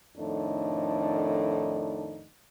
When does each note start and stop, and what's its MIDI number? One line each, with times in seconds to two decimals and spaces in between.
0.17 2.26 41
0.17 2.26 45
0.17 2.26 51
0.17 2.26 62
0.17 2.26 63